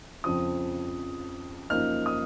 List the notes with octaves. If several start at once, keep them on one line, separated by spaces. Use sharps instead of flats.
F2 C#3 F3 D#6
F#2 F3 A#3 D#4 F6
D#6